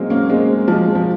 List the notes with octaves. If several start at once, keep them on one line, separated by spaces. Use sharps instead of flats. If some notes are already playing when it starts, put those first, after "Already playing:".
Already playing: F#3 G#3 A#3 C4
A#3 C#4
G#3 C4
F3 G#3
F3